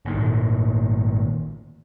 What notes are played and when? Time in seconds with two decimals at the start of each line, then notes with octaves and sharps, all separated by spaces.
0.05 G#1 A#2 D#3